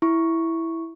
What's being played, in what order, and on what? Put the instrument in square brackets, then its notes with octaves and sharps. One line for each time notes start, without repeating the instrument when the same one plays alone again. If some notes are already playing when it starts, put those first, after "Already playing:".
[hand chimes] E4 C#6